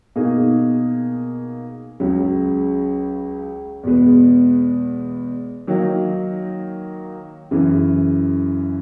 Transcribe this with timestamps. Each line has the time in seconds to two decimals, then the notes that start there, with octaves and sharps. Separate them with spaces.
0.16 B2 A#3 D#4 G#4
2.00 C#2 C#3 F#3
3.83 E2 B2 G#3 B3
5.67 D#3 F#3 A#3 D#4
7.51 F#2 C#3 E3